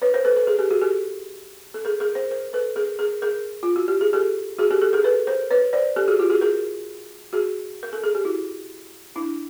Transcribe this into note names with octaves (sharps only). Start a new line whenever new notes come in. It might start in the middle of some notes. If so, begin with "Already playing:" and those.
B4 C#5
A#4 C5
A4 B4
A4 B4
G#4 A#4
G4 A4
F#4 G#4
G4 A4
A4
G#4 A#4
G#4 A#4
A#4 C5
A#4 C5
A4 B4
G#4 A#4
G#4 A#4
G#4 A#4
F4
F#4
G4
G#4
G4 A4
F#4 G#4
G4 A4
G4 A4
G#4 A#4
A4 B4
A#4 C5
B4 C#5
C5 D5
G4 A4
F#4 G#4
F4 G4
F#4 G#4
G#4 A#4
F#4 G#4
A#4
A4
G#4
G4
E4 F#4
D4 E4